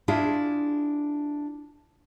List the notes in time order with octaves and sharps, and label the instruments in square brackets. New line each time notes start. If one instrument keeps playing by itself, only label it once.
[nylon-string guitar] D4 E4 F4 G#4